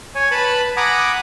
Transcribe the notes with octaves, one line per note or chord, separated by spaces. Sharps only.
C#5 G#5
B4 A5 B5
F#5 G#5 A#5 B5 D6 D#6